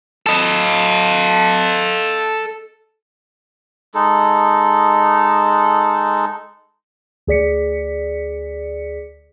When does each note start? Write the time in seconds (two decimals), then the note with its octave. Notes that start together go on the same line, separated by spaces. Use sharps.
0.26 A4 D#5
3.95 G#3 D#4 A4
7.27 D2 G#4 D5 B6 C#7